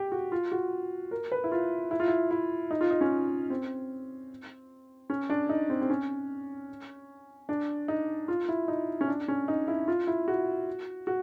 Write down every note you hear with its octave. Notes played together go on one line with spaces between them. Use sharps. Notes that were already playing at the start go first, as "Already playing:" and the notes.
Already playing: G4
F#4
F4
F#4
A#4
B4
E4
F4
E4
F4
E4
E4
D#4
F4
D#4
C#4
C4
C#4
D4
D#4
C4
C4
C#4
D4
D#4
F4
E4
D#4
C#4
D4
C#4
D#4
E4
F4
E4
F#4
F#4